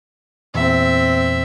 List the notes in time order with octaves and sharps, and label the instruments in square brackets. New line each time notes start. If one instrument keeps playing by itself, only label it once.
[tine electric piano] E2 A#2 [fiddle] C4 E5